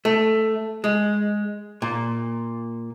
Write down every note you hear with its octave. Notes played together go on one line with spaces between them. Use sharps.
A3
G#3
A#2